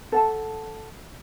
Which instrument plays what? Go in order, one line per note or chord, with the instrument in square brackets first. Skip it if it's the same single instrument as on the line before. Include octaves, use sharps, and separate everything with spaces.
[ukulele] A4 F#5 A5